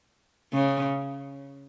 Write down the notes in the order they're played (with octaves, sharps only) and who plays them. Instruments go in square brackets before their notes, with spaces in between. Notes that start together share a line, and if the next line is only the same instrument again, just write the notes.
[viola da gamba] C#3